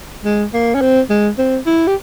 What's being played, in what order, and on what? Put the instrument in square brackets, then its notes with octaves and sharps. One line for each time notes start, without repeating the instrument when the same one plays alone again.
[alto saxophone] G#3
A#3
C#4
C4
G#3
C4
E4
G4